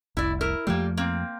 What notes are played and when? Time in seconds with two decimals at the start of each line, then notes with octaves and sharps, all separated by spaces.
0.17 F1 C2 E4 D5
0.41 E4 A#4
0.67 F2 F3 G3 A3 A#3
0.97 A#3 C4